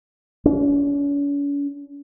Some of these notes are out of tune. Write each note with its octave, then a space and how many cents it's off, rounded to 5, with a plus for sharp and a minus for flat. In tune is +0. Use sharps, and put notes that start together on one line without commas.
C#4 +45